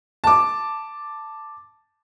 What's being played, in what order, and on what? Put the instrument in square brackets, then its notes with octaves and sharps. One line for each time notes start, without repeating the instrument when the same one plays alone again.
[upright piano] A5 D6